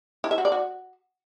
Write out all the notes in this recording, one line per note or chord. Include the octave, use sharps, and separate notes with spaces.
E4
E5
F#4
D5
F#4